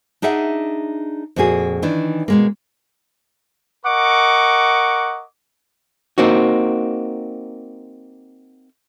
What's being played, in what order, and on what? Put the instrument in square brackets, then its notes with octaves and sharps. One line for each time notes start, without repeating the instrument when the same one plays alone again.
[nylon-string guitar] D4 D#4 G#4 E5 F#5
F2 A#2 A#3 F#4 G#4
D#3 E3 D4
B2 G#3 A#3
[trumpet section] A#4 D#5 F#5 C#6 D6
[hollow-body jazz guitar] A#3 C4 D#4 F#4